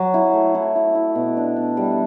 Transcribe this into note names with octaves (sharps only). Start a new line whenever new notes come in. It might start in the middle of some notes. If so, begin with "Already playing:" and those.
Already playing: F#3
E4
A3
E4
E4
E4
B2
D4
D4
G3